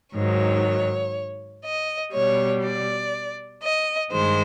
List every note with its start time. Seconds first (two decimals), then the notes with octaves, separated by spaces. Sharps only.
0.16 G#2 D#3 F#3 C#5
1.65 D#5
2.14 B2 G3 C#5
2.64 D5
3.63 D#5
4.11 G2 D#3 G#3 C5